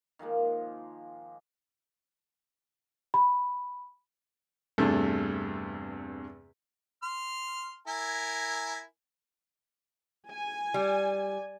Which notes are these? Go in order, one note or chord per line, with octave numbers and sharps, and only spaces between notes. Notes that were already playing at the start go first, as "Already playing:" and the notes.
D#3 F3 G#3 A#3
B5
E2 G2 C3 A3
C6 F6
E4 A#4 G#5
G#5
G3